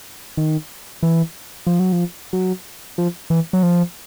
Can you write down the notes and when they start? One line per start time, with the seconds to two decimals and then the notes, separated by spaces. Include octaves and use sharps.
0.37 D#3
1.03 E3
1.67 F3
1.80 F#3
1.92 F3
2.33 F#3
2.98 F3
3.30 E3
3.53 F#3
3.63 F3